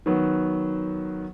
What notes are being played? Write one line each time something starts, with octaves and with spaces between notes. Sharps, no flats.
D#3 F#3 B3